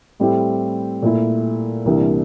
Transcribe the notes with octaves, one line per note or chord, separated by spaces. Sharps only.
A2 G3 C4 E4 G4
A#2 A3 E4
C2 C3 E3 A#3 D4